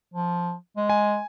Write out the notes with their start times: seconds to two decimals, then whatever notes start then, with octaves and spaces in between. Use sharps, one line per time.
0.14 F3
0.76 G#3
0.90 G#5